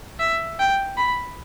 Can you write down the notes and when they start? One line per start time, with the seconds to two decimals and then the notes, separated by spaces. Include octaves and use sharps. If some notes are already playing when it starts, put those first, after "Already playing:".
0.19 E5
0.59 G5
0.98 B5